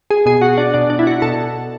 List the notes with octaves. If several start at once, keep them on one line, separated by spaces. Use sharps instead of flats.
G#4
B2 G#4
F#4
D4
B2 D4
D4
E4
F#4
B2 A4